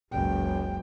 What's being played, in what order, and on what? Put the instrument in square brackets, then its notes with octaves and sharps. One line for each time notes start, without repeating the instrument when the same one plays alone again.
[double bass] F#1 C#2 [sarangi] G5